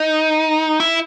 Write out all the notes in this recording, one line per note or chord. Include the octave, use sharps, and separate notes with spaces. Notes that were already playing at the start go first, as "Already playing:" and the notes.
Already playing: D#4
E4